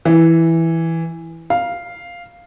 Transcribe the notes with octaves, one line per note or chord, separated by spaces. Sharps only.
E3
F5